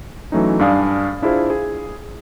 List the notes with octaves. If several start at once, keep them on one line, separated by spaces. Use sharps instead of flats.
E3 F#3 A3 C#4 D#4
G2 D4 F5 G#5 D#6
D4 E4 F4 G#4 C5 F5
G#4